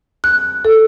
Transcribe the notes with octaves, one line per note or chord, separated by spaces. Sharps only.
F#6
A4